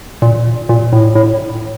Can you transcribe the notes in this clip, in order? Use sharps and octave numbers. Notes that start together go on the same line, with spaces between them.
A#2
A#2
A2
A2